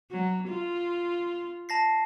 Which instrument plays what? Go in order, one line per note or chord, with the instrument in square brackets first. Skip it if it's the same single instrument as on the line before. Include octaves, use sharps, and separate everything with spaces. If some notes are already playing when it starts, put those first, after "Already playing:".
[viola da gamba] F#3
F4
[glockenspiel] A5 A#6 C7